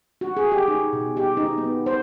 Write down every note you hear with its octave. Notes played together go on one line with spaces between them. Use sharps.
F#4
G#4
G4
D#4
B2
G4
D#4
B3
C5